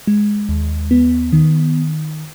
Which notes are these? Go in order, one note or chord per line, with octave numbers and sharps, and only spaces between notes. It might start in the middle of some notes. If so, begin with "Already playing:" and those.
G#3
D#2
B3
D#3